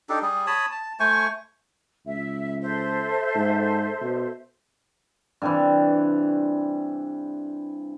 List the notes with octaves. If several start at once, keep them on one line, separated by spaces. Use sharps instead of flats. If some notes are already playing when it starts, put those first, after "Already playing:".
D4 D#4 G4 A4
G3 G#4
C#5 A5 B5 D#6
A5
A3 C5 G#5 C#6
C#2 E5
A4 C5 E5
G#2
B2
G2 C3 E3